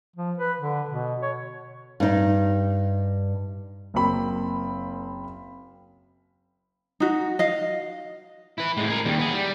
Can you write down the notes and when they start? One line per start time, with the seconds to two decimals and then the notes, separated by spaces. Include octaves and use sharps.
0.16 F3
0.38 B4
0.60 D3
0.89 B2
1.22 C#5
2.00 G2 D#4
3.94 F#1 A#3 C4 B5
7.00 D#4 F#4
7.39 D#5 F5
8.58 E4 B4
8.77 A2 G#3
8.89 G#4 A#4
9.05 D#2 G3
9.19 B3 G#4
9.33 G3